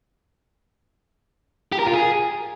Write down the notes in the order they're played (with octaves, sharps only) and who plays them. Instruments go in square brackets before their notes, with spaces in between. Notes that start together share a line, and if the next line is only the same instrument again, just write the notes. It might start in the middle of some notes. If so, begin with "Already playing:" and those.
[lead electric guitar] G4
A#4
F4
G#4